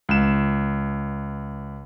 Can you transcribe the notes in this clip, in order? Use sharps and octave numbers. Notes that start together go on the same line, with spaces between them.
C#2 E7